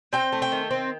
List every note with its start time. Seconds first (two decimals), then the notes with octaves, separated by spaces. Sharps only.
0.13 C4 G5
0.32 A3
0.42 G5
0.52 D#3
0.71 C4